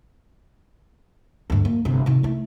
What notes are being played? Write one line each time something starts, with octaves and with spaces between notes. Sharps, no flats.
D2 G2
A#3
G1 C3
C3 D#3
A3 E4